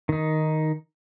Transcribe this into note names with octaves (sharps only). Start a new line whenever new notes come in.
D#3 D#4